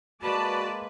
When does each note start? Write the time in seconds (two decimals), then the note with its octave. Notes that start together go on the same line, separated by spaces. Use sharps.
0.22 G#3 A#3 F#4 B4 D5 A5